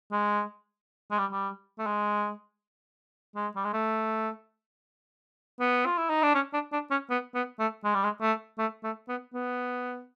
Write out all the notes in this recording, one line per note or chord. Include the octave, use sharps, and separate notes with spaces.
G#3
G#3
G3
G3
A3
G#3
G#3
G3
G#3
A3
B3
F4
E4
D#4
D4
C#4
D4
D4
C#4
B3
B3
A3
G#3
G3
G#3
A3
A3
A3
B3
B3